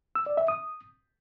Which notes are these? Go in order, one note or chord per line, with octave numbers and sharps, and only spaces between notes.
E6
D5
E5
D#6